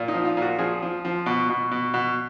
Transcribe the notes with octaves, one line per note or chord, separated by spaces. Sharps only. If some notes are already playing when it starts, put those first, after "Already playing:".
Already playing: A#2
D#4
F3
F4
A#2
F#4
F3 G#4
F3
F3
B2
B2
B2
B2